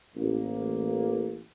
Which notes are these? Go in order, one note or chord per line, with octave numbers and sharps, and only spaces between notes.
A1 A#3